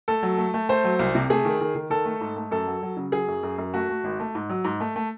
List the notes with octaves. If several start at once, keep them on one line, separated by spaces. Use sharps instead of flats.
A3 A4
F#3
A3
A3
A3 C5
F#3
C2
C3
A3 G#4
D#3
D#3
D#3
D#3 A4
A3
G#2
A3
F#2 A4
F#3
F#3
C#3
F#3 G#4
F#2
F#2
F#2
A3 F#4
A3
G#1
A3
G#2
F#3
G#2
A3
A3